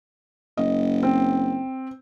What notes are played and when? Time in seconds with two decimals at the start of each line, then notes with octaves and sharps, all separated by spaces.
0.57 F#1 D#5
1.03 C4